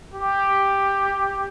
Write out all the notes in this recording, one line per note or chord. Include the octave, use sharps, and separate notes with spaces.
G4